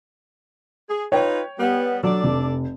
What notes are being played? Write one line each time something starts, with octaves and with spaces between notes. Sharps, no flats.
G#4
D#4 F4 B4 C#5 G5
G3 B3
F#3 D4 A4 D5
F1